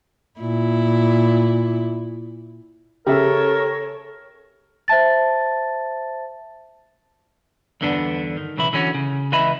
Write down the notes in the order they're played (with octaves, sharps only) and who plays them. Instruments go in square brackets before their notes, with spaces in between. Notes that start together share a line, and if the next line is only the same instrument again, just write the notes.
[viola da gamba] A#2 E4
[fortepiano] C#3 E5 [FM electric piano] G4 [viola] A4 C#5 [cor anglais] A#4
[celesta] C5 E5 A5 A6
[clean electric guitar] E2 G2 D3 B3 D4
D#3
B1 C#3 E3 E4
D3 E3 C#4 F#4
C#3
C#2 E3 B4 D#5 E5 B5